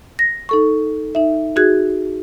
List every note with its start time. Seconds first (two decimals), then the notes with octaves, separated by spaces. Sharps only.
0.19 A#6
0.49 D#4 A4 C#6
1.15 D#4 E5
1.56 D#4 F#4 G#4 F#6 G#6